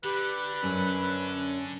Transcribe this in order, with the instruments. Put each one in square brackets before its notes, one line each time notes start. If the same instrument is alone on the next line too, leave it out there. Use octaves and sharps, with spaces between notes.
[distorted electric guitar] D3 [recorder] G4 [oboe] B4
[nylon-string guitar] F#2 [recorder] C#4